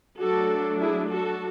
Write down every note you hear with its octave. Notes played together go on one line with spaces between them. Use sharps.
F#3 A3 D4 F#4 A4
E4 G#4
F#4 A4